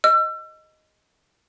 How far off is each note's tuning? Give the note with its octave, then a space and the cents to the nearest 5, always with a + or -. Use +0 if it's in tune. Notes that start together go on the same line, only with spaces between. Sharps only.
D#5 +0 E6 +35